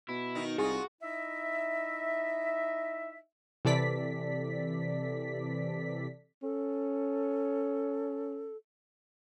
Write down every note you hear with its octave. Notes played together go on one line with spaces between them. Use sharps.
B2 E4
D#3 D#4
C2 D#4 F4 F#4 G#4
D#4 E4 D#5 E5
C3 E3 A4 D5 B6
C#4 A4